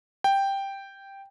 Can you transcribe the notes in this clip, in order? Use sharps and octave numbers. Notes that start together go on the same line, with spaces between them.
G5